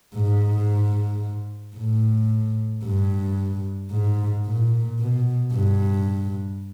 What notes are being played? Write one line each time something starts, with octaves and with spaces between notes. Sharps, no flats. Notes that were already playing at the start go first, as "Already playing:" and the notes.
G#2
A2
G2
G#2
A#2
B2
G2